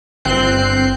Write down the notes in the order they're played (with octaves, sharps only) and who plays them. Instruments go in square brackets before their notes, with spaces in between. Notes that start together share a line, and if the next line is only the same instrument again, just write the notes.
[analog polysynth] G1 C4 F#6 G6 C7